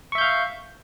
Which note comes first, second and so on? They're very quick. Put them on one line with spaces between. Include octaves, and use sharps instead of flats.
C#6 E5 G6 F5